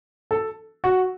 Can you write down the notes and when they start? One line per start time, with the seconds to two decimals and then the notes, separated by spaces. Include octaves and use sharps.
0.31 A4
0.84 F#4